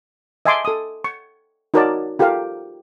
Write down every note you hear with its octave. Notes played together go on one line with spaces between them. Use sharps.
D#5 E5 G#5 A5 C6 D6
A4 D#6
C#6
D#4 F#4 A#4 C#5 D5 A5
F4 G4 A4 A#4 F5